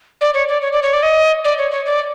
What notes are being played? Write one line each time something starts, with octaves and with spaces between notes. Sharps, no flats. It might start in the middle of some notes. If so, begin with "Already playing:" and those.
D5
C#5
D5
C#5
D5
C#5
D5
D#5
D5
C#5
C#5
D5